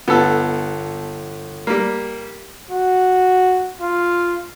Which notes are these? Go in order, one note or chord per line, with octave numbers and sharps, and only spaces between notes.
G1 B3 A4
G3 A#3
F#4
F4